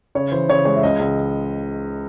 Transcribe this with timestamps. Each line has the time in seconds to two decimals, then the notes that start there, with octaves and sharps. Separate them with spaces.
0.15 C#3 C#5
0.32 E3 C5
0.49 C#3 C#5
0.65 G#3 C#5
0.76 E5
0.83 C#2 D#5
0.99 C#2